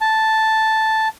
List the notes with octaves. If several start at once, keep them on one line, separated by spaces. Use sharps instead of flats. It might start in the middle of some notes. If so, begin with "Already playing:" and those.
A5